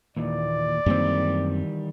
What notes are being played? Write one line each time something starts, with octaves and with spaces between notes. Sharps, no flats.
D#2 A#2 E3 D5
F#2 D#3 E3 G3 A#3 C4